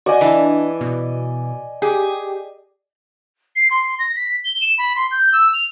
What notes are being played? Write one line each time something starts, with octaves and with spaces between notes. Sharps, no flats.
F#4 D5 D#5 G#5
E3 D4
B2
G4 G#4
C7
C6
A#6
B6
G7
E7
B5
C6
G6
E6
F7